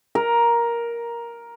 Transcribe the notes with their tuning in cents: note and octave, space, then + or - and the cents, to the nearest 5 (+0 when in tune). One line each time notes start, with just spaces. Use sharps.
A#4 +10